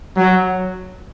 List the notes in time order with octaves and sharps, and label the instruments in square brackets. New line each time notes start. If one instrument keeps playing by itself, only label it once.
[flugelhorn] F#3